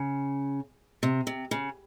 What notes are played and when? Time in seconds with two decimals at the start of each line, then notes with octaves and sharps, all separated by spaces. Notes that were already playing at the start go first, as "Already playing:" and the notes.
Already playing: C#3
1.03 C3
1.27 C3
1.51 C#3